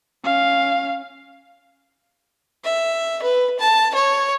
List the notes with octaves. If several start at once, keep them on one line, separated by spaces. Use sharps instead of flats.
C#4 F5
E5
B4
A5
C#5